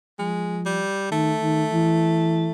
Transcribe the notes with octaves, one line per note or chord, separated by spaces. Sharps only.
F3 G#3
G3
D#3 A3
D#3
E3